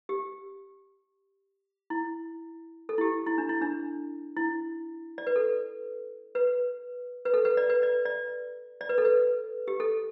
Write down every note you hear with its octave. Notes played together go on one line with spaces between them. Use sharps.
G4
E4
A4
E4
G4
E4
D4
E4
D4
E4
D5
B4
A4
B4
B4
A4
B4
D5
B4
D5
D5
D5
B4
A4
B4
G4
A4